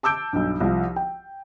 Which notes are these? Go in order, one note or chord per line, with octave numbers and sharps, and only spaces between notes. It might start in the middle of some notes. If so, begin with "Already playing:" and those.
A5 D6 E6 G6 D7
B1 G2
C2 F3
G5